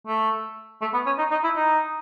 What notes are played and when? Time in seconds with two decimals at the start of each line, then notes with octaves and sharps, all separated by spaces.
0.07 A3
0.81 A3
0.93 B3
1.06 C#4
1.18 D#4
1.31 D#4
1.43 E4
1.56 D#4